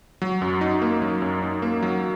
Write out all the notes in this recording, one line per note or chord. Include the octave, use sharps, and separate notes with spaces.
F#3
F#2
D#4
A#3
F#3
F#2
D#4
A#3
F#3